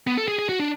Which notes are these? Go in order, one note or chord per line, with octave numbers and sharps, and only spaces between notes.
B3
A4
G#4
G#4
F#4
D4